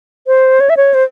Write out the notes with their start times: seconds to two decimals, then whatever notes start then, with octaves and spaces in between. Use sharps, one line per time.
0.27 C5
0.60 C#5
0.70 E5
0.77 C#5
0.94 C5